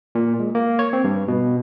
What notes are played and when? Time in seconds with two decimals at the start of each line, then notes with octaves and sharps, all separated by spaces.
0.15 A#2
0.40 G#3
0.55 A#3
0.79 C#5
0.93 C4
1.04 G2
1.28 B2